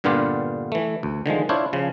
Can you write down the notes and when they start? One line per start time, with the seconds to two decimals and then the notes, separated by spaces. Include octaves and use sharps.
0.04 G2 A#2 D3 B3 F4 G4
0.72 E3 A3
1.03 D2
1.26 D3 D#3 F3 G#3
1.49 D4 E4 F4 C5 C#5
1.73 C#3 F3